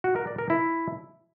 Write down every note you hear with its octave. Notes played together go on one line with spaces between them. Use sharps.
F#4
A#4
D5
A#4
E4